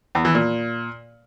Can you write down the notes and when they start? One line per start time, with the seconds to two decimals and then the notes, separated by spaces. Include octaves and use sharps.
0.15 E2
0.25 E3
0.35 A#2